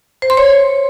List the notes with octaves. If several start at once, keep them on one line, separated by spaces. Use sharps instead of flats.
C5
C6
C#5